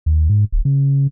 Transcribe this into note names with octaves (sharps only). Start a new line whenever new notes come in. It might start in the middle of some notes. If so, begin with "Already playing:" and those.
D#2
G#2
D1
C#3